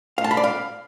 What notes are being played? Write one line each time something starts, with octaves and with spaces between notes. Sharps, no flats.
F5
A5
B5
D5
F5